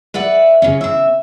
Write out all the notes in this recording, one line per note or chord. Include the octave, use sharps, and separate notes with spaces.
B4 D5 E5 F#5
C#3 C#4
C#3 E5